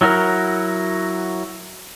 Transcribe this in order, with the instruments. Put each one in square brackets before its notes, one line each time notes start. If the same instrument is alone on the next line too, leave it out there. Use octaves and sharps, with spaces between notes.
[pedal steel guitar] F#3 E4 F#4 A#4